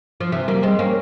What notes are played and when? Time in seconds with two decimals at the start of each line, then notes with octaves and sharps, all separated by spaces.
0.20 F3
0.32 C3 E3
0.48 G3 A#3
0.63 G#3 C4
0.79 A#3 C#4